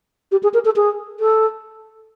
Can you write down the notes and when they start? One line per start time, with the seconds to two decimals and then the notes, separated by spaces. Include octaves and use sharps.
0.32 G4
0.43 G#4
0.54 A#4
0.65 A4
0.76 G#4
1.20 A4